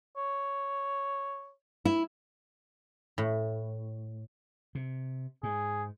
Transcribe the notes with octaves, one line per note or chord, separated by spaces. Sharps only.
C#5
E4
A2
C3
G#2 G#4